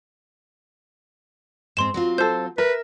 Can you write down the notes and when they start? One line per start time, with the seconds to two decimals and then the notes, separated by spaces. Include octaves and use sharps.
1.77 G#2 C4 C6 E7
1.94 F#3 C4 F4
2.18 A4 C5 G6
2.58 A#4 B4 E5